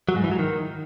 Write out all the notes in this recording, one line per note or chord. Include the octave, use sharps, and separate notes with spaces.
F#3
G#2
E3
F#3
D#3